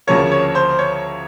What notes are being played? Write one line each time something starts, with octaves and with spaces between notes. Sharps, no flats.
D2 C#3 F3 A#3 C#5
C#5
C5
C#5